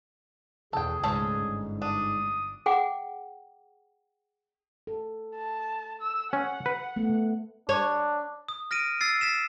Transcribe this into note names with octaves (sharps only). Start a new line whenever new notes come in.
E2 B2 G#4 A4 G5
C#2 G#2 C#4 A4 C#5
G1
D4 D#6
G#4 F#5 G5 D6
A4
A5
E6
C#4 F#5
B4
A3 B3
D4 C#5
D#6
F6 A#6 D7 D#7
E6 A6 C7
A6 B6 E7